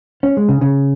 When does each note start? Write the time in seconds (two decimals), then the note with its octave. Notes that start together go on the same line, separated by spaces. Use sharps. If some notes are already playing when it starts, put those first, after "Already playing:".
0.23 C#4
0.37 G#3
0.49 C#3
0.61 C#3